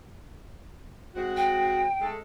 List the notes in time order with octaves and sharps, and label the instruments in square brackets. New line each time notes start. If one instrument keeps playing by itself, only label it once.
[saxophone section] G#3 C4 F#4
[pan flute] G5
[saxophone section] G#3 A3 A4